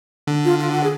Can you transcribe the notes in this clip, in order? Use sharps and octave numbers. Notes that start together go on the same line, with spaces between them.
D3
F4
F4
F#5
G#4